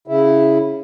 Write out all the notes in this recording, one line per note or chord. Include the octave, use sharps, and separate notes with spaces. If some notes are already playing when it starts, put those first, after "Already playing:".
C#3 E4